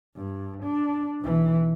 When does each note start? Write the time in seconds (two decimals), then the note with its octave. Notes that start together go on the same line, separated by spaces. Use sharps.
0.16 G2
0.63 D4
1.21 B1 E3